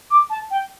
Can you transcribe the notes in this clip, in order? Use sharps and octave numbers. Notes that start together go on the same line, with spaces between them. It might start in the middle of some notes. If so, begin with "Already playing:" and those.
D6
A5
G5